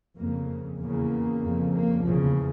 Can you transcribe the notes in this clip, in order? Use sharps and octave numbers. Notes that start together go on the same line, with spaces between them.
F2 C#3 A#3
E2 C#3 A#3
F2 C#3
A#3
E2 C#3 F3